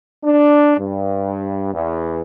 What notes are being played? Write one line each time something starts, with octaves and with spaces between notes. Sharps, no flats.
D4
G2
E2